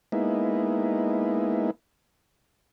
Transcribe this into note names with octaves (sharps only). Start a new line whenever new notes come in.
G#3 A#3 B3 D#4 E4